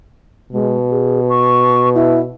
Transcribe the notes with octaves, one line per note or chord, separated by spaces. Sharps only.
B2 G#3
G#4
C#6
E4